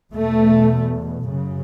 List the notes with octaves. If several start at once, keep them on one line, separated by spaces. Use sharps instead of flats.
E2 B2 A3
F#2 C#3